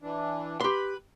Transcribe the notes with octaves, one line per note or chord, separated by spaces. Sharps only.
E3 D4
G4 B4 B5 C6